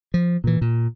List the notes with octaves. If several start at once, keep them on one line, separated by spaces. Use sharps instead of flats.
F3
A#2 E3
A#2